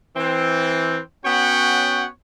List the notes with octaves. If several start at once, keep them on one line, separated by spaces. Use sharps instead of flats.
E3 C4
B3 C#4 F#4 C#5 F#5 G5